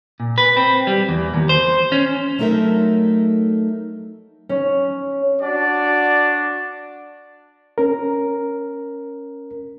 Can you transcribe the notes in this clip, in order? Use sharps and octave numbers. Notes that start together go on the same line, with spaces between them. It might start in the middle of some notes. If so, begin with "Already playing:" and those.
A#2
B4
C4
G3
E2
D#2
C5
C#4
F#3 A3 D#4 A4 A#4 E5
C#4
D4 F#4 D5
C#4 A#4